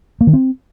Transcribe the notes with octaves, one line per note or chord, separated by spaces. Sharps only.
A#3
D#3
C4